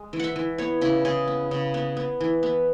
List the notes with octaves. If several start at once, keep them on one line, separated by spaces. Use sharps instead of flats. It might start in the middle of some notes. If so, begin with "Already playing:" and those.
Already playing: G#3
E3
E5 F#5
E3
B3 C#5
C#3 E4
C#3 G#4
B3
C#3
B3
B3
E3
B3